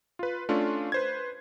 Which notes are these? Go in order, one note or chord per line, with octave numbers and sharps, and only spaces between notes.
F4 B4
A3 C#4 D4 F4
B4 C5 G#6